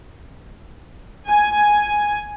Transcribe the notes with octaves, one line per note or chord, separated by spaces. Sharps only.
G#5